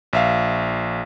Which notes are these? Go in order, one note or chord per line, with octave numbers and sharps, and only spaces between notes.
A#1 E5 F5